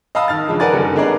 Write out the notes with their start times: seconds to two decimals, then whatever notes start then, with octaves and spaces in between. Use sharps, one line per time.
0.15 D#5 F5 A5 B5 D#6 E6
0.28 D#3 F6 A6
0.48 C#3 F3 G#3 D4
0.60 A#4 B4 D5 F#5 G#5 A6
0.73 F#1 D#3 G3 A4
0.95 B3 D4 D#4 G#4 A#4 D5